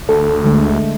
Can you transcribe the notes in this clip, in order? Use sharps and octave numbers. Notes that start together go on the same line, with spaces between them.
D2 A4
D3 G#3 A3